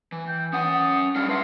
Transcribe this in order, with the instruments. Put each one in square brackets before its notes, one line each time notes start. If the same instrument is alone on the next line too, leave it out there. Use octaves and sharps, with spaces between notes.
[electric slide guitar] E3
[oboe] G5
[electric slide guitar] C#4 F#5 [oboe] D#6
[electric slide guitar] G3 D4 D#4 [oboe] F5
[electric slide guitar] B4 E5 F#5 [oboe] C6